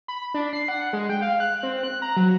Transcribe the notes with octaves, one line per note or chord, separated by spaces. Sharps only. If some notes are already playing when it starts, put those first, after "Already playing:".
B5
D4
C7
F#5
G#3
G5
F5
F#6
C4
F#6
A#5
F#3